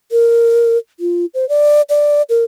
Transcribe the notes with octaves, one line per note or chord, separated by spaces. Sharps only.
A#4
F4
C5
D5
D5
A#4